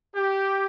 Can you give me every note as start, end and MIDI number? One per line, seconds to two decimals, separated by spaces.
0.15 0.65 67